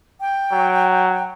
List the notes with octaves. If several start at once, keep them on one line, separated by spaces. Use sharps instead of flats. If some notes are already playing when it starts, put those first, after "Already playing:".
G5
F#3